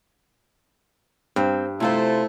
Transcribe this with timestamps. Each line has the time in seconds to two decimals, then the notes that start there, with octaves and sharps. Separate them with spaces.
1.36 G2 C4
1.80 C3 A3 E4 F4 C5